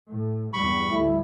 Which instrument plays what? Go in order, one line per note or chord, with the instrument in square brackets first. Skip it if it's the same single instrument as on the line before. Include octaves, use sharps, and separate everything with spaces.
[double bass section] A2
[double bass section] E2 G2 G3 [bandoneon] B5 C#6
[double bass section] A1 D2 [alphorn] E4